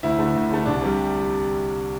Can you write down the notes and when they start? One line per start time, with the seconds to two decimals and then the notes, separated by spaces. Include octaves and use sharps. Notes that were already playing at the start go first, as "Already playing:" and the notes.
0.03 D2 E4
0.19 D3 A3
0.36 D2
0.51 D3 A3
0.66 C2 D4
0.82 C3 G3